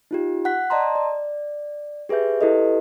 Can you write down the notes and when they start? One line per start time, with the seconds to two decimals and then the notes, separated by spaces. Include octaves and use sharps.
0.11 D#4 F4 G4
0.45 F#5 F#6 B6
0.70 D5 D#5 A5 A#5 C6
0.95 D5
2.09 G4 G#4 B4 E5 G6
2.41 E4 G4 A4 B4 D#5